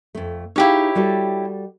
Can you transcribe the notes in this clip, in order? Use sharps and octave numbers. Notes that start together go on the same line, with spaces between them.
F2 A3
D#4 E4 G4 G#4 C#5 F5
G3 F#4 A4